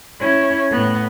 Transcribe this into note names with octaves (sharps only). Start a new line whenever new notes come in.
C#4 E4
A2 B3